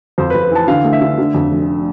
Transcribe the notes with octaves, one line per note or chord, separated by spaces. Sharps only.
F2 C5
B4
F2
B4
E3 A5
D3 F5
A3
E5
D3
D3
F2
F1